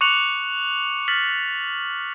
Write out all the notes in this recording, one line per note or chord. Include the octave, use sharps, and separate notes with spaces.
C#6 D6 F#6 C#7 F7 F#7
F6 A6 B6 F#7